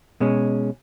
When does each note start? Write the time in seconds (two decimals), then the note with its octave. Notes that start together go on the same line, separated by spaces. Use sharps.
0.20 B2 G#3 C#4